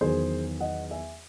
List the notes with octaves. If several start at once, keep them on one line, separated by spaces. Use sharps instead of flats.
E2 D#3 F#3 G#4 C5
D#5 F#5
E5 G#5